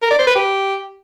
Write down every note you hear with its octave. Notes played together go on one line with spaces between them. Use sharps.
A#4
D5
C5
B4
G4